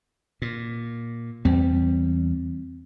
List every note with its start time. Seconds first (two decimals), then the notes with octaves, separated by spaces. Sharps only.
0.42 A#2
1.45 E2 G3 C4